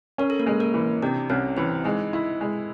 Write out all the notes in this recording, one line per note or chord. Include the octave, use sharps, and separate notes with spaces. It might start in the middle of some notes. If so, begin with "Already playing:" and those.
C#4 A#4
A4
A#3 A#4
G#3
A#3 A#4
E3
C3 D4 D5
C2 C#4 C#5
E3 C4 C5
G#3 D#4 D#5
E4
G#3